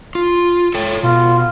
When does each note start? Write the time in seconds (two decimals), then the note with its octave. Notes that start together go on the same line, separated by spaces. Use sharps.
0.15 F4
0.74 A4 C#5 G5
1.03 B2 F4